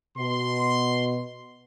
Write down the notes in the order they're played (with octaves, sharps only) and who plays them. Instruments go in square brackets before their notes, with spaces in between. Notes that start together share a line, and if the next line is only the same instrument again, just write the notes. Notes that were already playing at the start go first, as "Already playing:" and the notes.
[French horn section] B2 [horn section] C6